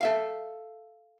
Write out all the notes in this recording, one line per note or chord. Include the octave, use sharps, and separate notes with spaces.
A4 E5 F5